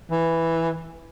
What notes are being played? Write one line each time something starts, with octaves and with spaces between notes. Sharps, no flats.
E3